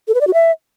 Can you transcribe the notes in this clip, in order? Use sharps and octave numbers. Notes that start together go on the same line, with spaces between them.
A4
B4
D5
F#4
E5